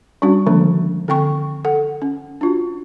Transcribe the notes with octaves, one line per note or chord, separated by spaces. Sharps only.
G3 C#4 D4 F#4
D3 D#3 F3 G#3 A#3 D4
D3 C4 G5 C#6
A4 F#5
C#4
D4 F4 F#4